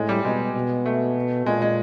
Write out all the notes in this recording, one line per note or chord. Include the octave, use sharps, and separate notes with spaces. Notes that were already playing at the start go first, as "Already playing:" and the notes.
Already playing: A2 G#3
G3
B2 G#3
B2
A3
A#2 G#3
G#3